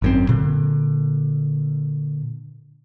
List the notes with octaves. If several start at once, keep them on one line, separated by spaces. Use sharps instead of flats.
G#1 F#2 C4
A#2 D3